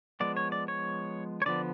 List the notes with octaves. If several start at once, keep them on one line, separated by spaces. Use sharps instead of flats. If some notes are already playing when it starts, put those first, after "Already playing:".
F3 G#3 B3 D5
C#5
D5
C#5
C#5
D3 F3 B3 D5